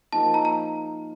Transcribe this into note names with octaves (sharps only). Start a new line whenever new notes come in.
F3 A#3 D#4 A5
A#5
A#5